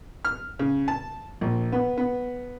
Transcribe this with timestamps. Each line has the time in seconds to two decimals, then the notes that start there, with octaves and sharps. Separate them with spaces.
0.25 F6
0.59 C#3
0.88 A5
1.41 A#1
1.72 B3
1.98 B3